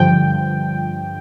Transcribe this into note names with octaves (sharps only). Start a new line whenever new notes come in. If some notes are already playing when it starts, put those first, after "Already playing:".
Already playing: G2 D3 F3 G5